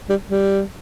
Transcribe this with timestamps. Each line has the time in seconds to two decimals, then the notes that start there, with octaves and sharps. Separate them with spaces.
0.10 G3
0.28 G3